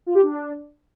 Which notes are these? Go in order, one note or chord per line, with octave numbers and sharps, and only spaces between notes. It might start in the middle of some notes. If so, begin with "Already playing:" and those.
F4
G4
D4